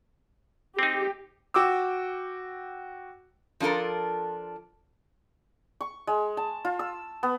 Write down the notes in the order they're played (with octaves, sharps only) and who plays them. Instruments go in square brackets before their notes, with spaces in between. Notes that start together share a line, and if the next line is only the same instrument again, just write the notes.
[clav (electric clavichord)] C4 D#4 [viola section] G4
[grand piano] F#4 G5 D6 E6
[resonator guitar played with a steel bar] F3 D4 F4 A4 A#4
[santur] C#6
G#3
A5
F4
E6
B3